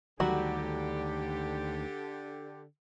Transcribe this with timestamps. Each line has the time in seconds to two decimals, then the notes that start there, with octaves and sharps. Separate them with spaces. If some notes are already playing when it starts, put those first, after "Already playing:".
0.20 D2 D3 D#3 F#3 G3 F#4 G4